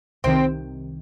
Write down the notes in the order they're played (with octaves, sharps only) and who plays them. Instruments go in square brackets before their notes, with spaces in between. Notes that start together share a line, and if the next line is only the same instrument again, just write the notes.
[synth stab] C2 C3 D#3 [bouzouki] C4